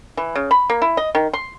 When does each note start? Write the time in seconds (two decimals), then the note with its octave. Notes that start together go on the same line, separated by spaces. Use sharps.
0.17 E3
0.35 C#3
0.51 B5
0.70 A#3
0.82 E4
0.97 D#5
1.15 D#3
1.33 C6